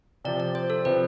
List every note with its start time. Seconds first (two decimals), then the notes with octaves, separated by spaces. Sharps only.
0.25 C3 F3 C4 D5
0.40 D5
0.55 C5
0.70 A4
0.85 C3 F3 C4 B4